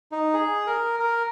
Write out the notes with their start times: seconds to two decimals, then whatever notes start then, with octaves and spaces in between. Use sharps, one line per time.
0.12 D#4
0.34 G#4
0.67 A#4
1.00 A#4